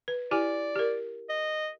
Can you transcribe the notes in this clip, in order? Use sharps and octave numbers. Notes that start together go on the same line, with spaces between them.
B4
E4 G4 D5 G#5
G4 A#4
D#5